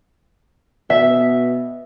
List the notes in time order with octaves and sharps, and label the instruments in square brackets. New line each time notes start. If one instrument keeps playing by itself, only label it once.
[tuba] B2 [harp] E5